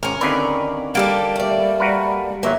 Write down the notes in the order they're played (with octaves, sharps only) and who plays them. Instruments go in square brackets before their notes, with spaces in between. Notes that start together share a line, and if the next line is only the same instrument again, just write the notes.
[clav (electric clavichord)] G#1 [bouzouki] C#4 A#4
[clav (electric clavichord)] D#2 D3 B4 [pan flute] C4 [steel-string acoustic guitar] D5
[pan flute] G3 [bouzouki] A#3 G4 A4
[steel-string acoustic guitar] A3 D5
[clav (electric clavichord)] F#4 A#4 B4
[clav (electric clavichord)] G1 F#3 [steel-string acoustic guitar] A#3 D#4 [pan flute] E5